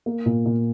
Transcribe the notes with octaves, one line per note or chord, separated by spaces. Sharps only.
A#3
A#2
A#2